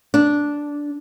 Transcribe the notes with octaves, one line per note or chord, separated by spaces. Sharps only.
D4